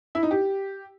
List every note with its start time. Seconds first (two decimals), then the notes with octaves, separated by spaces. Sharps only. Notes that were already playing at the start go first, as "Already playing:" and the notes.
0.15 E4
0.23 D#4
0.31 G4